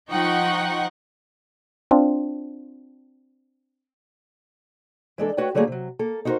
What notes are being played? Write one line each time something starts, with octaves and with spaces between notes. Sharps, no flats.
F3 D#4 F#5 G5 C#6
C4 D4 F4
E3 G#3 D4 A4
A3 F#4 B4 C#5 G5
D3 F#3 G3 A3 A#3 G#4
C3 F#3
A#3 A4
D#4 E4 F#4 G4 A#4 C5